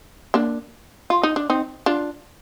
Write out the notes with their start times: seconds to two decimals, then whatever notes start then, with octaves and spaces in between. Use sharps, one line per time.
0.34 A#3 D4
1.10 F4
1.23 D#4
1.36 D4
1.50 C4 D#4
1.86 D4 F4